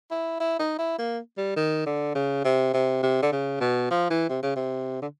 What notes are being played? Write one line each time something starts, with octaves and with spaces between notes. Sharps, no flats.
E4
E4
D#4
E4
A#3
G3
D#3
D3
C#3
C3
C3
C3
D3
C#3
B2
F3
E3
C3
C#3
C3
D3